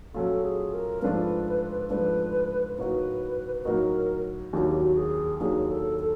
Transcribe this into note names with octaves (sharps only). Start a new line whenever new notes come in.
A#2 F#3 A3 C#4 F4 A4
G#4
A#4
G#2 F3 A3 D4 F4 B4
G#2 F3 A3 D4 F4 B4
A2 F#3 A#3 D#4 F#4 B4
B4
A2 F#3 A#3 D#4 F#4 A#4
D#2 D#3 F#3 A#3 D4 F#4
G4
F#4
G#4
D#2 D#3 F#3 A#3 D4 G#4
A4
A4